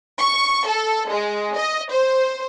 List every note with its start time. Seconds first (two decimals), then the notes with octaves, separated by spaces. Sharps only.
0.20 C#6
0.68 A4
1.11 G#3
1.58 D#5
1.93 C5